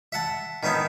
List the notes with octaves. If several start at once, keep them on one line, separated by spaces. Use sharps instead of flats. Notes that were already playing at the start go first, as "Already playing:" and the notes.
E5 F#5 A5
D#3 B3 C#4 D#4 E4